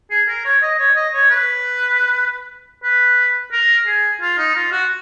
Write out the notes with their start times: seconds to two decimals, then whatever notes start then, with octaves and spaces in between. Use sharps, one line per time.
0.11 G#4
0.28 A#4
0.45 C#5
0.62 D#5
0.79 C#5
0.96 D#5
1.14 C#5
1.30 B4
2.84 B4
3.53 A#4
3.87 G#4
4.21 F4
4.38 D#4
4.55 F4
4.72 F#4